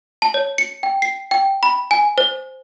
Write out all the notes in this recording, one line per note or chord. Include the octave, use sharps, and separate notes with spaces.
A5
C#5
C#7
G5
C7
G5
B5
G#5
C5